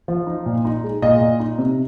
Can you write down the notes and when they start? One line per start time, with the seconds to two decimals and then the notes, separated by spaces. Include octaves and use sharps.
0.08 F3
0.27 D#4
0.46 A#2
0.65 D#4
0.84 G#3
1.02 A#2 D#5
1.21 A#2
1.40 D#4
1.59 C3